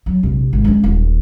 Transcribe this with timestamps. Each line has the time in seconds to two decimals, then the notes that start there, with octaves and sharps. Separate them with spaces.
0.06 F#3
0.23 A#1 C3
0.53 G#1
0.64 G#3 C#4
0.83 D#1